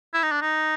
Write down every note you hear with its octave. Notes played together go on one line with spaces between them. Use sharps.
E4
D#4
D4
D#4